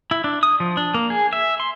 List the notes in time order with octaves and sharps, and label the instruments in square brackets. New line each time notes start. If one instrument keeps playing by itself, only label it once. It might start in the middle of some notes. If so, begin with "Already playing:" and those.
[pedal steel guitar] E4
D4
D#6
F3
D4
A#3
G#4
E5
C6